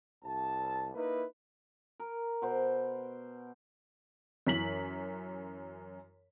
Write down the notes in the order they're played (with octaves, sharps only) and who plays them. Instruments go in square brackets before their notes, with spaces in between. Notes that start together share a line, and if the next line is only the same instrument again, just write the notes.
[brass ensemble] C2 A5
A#3 D#4 E4 B4
[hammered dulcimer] A#4
B2 C5
[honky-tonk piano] F#2 E3 B6 F#7